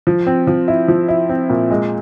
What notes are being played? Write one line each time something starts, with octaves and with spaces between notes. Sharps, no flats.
F3
C4
F3
E4
F3
E4
C4
A#2
G#3